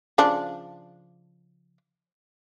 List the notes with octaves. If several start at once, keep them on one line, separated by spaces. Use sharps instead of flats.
C#3 F3 D4